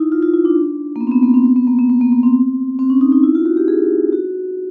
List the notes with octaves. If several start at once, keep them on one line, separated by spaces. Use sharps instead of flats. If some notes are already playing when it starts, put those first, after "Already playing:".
Already playing: D#4 E4
F4
F4
E4
D4
A#3
B3
C4
B3
A#3
C4
B3
B3
A#3
B3
B3
A#3
B3
C4
C4
C#4
D#4
D#4
E4
F4
F#4
G4
G#4
F#4